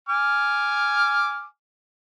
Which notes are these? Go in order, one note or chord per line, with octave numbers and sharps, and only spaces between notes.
G#5 D6 F6